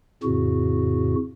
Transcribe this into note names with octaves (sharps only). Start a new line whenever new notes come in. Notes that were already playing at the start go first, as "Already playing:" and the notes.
F2 A2 C#3 F#4